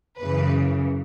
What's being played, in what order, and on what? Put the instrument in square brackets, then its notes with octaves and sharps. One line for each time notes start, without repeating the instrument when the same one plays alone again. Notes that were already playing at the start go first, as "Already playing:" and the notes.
[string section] F#2 C#3 E3 B4